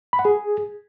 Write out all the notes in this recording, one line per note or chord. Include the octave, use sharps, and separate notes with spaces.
B5
F#5
G#4